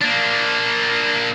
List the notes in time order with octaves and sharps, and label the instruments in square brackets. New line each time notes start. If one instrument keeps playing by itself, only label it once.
[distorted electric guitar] A#3 D4